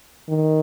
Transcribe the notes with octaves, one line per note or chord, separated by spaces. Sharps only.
D#3